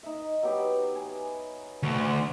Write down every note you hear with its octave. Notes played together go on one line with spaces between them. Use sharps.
D#4 E5
F#3 B3 G4
G#5
D2